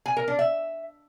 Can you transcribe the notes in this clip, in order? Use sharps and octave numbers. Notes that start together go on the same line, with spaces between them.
G#5
A#4
D4
E5